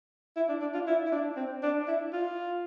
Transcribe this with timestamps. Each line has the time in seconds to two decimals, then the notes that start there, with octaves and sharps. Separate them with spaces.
0.36 E4
0.49 D4
0.61 D4
0.74 F4
0.87 E4
1.06 E4
1.12 D4
1.36 C4
1.63 D4
1.88 E4
2.13 F4